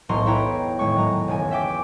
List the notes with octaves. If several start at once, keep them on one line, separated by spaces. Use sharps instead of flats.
E1 B1 A2 A#5 C6 C#6
E4 B4 C#5 G5 A#5
G#1 A2 G#3 C#5 C#6
F#3 A#5
E1 C#2 E3 G#5
E5 G5 D6 B6